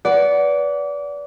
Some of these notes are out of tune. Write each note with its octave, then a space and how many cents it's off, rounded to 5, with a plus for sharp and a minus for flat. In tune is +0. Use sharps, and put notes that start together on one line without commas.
B4 -5 D5 -25 F#5 +0